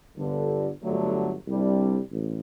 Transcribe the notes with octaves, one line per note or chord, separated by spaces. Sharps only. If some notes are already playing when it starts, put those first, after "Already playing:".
G1 G2 D3
G1 G2 D3 F#3 A3
C2 C3 G3 D4
A1